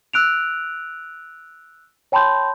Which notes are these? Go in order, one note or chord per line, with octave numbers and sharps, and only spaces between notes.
E6 F#6 D7 F7
C#5 G5 A5 B5 C6 G6